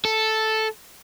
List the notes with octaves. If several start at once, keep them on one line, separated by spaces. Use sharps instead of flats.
A4